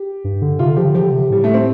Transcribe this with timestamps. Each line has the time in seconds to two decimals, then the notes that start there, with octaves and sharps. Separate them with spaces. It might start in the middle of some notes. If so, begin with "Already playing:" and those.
Already playing: G4
0.24 G2
0.42 D3
0.59 C3 F4
0.68 D3
0.76 F3 G4
0.86 D3
0.95 F3 G4
1.03 D3
1.12 C3
1.30 A2 G3
1.44 A3
1.54 C4